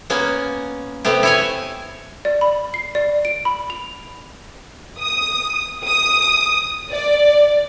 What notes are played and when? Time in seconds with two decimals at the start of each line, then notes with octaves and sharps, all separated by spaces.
0.10 A#3 B3 C#4
1.05 C3 A3 B3 G4
1.23 E4 C#5 G#5
2.25 D5
2.41 B5
2.74 C7
2.95 D5
3.25 D7
3.45 B5
3.70 F7
4.99 D#6
5.86 D#6
6.91 D5